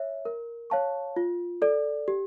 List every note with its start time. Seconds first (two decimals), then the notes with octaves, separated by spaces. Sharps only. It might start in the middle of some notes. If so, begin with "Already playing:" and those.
Already playing: C#5 E5
0.25 A#4
0.70 C#5 F5 A5 C#6
1.16 F4
1.62 A4 D5
2.08 G4